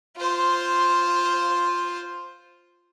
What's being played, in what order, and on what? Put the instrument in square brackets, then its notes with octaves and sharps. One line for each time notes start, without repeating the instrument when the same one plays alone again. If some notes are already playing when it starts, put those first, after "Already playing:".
[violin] F4 C5